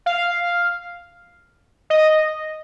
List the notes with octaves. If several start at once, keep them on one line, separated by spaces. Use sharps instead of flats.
F5
D#5